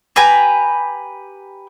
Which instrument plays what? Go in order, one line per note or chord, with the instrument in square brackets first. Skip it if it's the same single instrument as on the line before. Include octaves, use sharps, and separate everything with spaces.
[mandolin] G4 B4 G#5 A#5